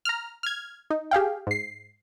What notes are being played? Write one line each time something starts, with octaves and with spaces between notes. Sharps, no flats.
A#5 F6
F6 G#6
D#4
G4 G#4 F5 G5
G#2 C7